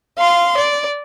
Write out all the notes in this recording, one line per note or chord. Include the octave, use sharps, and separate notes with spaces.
F5 C6
D5